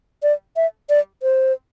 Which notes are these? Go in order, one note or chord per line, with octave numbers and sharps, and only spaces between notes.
D5
E5
D5
C5